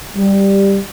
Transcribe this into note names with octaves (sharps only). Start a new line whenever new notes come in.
G3